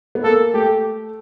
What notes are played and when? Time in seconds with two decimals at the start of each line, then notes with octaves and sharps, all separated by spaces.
0.15 B3
0.24 A#3 A4
0.54 A3 G4